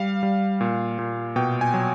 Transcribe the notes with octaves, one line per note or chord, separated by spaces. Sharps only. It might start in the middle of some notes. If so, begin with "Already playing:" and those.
Already playing: G3 F5
G3
A#2
A#2
B2 G5
G#5
F#3